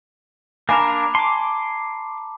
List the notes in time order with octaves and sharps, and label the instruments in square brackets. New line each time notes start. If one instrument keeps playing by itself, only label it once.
[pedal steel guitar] A#3 D4 A#4 [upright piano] G#5 [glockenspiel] A#5 B5 D6
[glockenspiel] A5 [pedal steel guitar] C6 D6